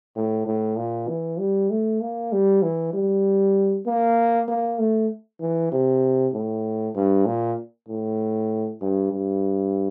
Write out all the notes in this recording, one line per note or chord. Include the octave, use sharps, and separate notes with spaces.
A2
A2
A#2
E3
G3
A3
A#3
G3
E3
G3
A#3
A#3
A3
E3
C3
A2
G2
A#2
A2
G2
G2